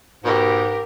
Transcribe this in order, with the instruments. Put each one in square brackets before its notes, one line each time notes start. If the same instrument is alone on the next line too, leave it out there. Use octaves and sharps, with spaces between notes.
[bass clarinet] G#2 [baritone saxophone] B2 [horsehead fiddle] G4 A#4